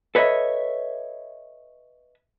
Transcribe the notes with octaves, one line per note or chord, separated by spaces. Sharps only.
A4 B4 C#5 D#5 E5